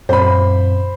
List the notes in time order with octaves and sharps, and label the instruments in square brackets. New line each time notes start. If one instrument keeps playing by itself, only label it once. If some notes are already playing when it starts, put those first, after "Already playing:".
[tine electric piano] F#2 A#2 C4 [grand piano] C5 B5